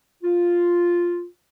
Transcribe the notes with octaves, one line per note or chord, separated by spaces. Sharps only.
F4